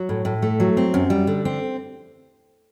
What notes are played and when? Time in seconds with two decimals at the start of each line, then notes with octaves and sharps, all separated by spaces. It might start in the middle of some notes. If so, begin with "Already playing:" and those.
Already playing: F#3
0.09 A2
0.25 A2
0.42 A3
0.60 F#3
0.77 C4
0.94 F#2
1.10 G3
1.27 D3
1.45 C4